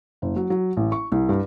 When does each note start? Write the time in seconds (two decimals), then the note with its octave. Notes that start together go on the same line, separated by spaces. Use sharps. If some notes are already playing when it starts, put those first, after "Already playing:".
0.22 F#1
0.36 F#3
0.50 F#3
0.77 A1
0.92 C#6
1.12 C2
1.29 G2